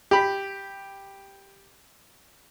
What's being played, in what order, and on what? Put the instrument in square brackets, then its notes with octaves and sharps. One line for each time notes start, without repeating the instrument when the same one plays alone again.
[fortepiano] G4 B5